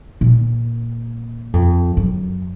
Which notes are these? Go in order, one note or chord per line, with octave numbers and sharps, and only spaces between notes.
A#2
F2
F#2